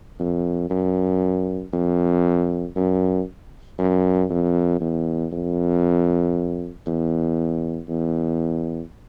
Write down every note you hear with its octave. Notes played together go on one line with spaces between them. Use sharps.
F2
F#2
F2
F#2
F#2
F2
E2
F2
E2
E2